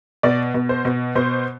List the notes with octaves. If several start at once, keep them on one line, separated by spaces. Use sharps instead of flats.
B2 D5
B2
C5
B2
B2 C5